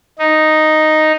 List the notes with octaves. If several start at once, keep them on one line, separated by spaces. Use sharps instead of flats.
D#4